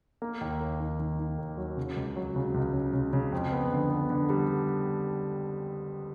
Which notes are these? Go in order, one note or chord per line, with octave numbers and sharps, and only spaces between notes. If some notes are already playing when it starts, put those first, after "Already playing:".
A#3
D#2
D#2
D#3
D#3
D#3
D#2
F#3
C#3
C#2
F#3
C#3
C#2
C#3
C#3
C#3
F2
B3
D3
B3
D3
G3